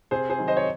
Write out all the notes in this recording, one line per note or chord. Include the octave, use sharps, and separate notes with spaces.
C3 G#4 C5
G#4 C5
D#3 F#3
C5 D#5
C#5